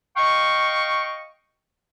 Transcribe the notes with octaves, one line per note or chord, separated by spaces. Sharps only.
D#5 F5 G5 C#6